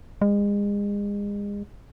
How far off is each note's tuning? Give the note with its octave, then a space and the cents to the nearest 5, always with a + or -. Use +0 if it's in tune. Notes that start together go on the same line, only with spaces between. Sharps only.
G#3 -35